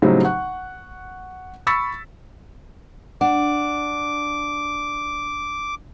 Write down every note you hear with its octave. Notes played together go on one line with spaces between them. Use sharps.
A2 C#3 F#3 G3 C4 D#4
F#5 C#6 F#6
B5 C#6 E6 A6 B6 C#7
D4 F#5 D6